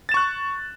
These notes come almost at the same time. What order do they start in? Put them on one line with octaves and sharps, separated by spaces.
A6 E7 C#6 F#6